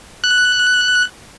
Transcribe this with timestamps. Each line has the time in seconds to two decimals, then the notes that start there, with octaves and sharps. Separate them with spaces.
0.24 F#6